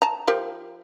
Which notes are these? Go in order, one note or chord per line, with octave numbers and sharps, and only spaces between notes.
A5 A#5
F3 G4 A#4